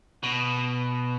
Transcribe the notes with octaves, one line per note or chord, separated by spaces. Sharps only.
B2